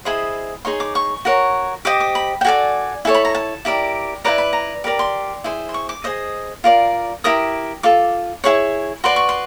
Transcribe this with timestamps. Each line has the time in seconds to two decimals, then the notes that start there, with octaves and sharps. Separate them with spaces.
0.05 E4 G#4 C5 D#5 B5
0.65 D#4 G#4 C#5 C6
0.80 D6
0.95 C#6
1.25 F#4 A#4 C#5
1.85 G4 C5 D#5 D6
2.00 D6
2.15 B5
2.41 G5
2.45 F#4 A4 D5 G#5
3.05 E4 A4 C#5 G#5
3.14 B5
3.25 A#5
3.35 A5
3.65 E4 G4 A#4 D5
4.24 E4 G4 B4 D5 A#5
4.38 B5
4.53 A#5
4.84 G4 A#4 D5 B5
4.99 C6
5.44 E4 G#4 C5
5.69 C6
5.74 C#6
5.89 D6
6.04 G#4 C5 D#5 D#6
6.64 F4 A#4 D5
7.24 E4 G4 A#4 D#6
7.83 F4 A4 D6
8.44 E4 G#4 C#5 C#6
9.04 F#4 B4 D5 C6
9.16 C#6
9.29 C6